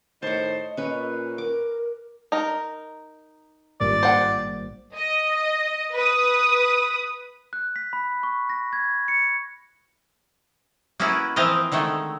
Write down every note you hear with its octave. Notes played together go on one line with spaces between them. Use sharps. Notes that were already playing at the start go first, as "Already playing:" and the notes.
A2 D#3 C5 C#5 D#5 A5
A#2 C#4 B4
A#4 D6
D#4 A#4
G#1 G2 A#2 D5
C5 F#5 G5
D#5
B4 D#6
F#6
B6
B5
C#6
A#6
G#6
C#7
A#3 B3 C#4 E4 F#4
E3 F3 C4 A#4 D#5 F5
D3 D#3 G#3 A3